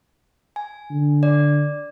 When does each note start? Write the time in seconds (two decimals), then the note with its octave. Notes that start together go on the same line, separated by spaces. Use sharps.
0.56 G#5
0.91 D3
1.23 D5